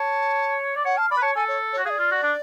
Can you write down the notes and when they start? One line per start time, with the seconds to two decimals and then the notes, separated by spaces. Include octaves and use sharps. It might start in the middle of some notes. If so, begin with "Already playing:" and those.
Already playing: C#5 A5
0.76 D5
0.85 C#5 F#5
0.97 F5 A5
1.11 D5 B5
1.17 B4
1.22 C#5 A5
1.35 A4 G#5
1.48 C#5
1.73 C#5
1.78 F#4
1.85 G#4 F5
1.90 D5
1.98 F4
2.11 F#4
2.23 D4